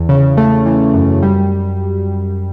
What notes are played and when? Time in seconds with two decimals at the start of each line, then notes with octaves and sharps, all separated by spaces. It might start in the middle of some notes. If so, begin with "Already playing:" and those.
Already playing: E2
0.09 C#3
0.37 A3
0.66 E3
0.94 F#2
1.22 G3